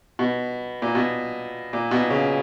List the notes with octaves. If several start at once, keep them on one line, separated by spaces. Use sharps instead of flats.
B2
A#2
B2
A#2
B2
C#3